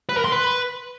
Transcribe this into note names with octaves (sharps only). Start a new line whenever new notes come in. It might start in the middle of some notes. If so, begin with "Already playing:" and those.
B4
A#4
C6
B4